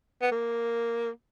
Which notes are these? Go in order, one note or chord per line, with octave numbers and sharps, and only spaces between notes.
B3
A#3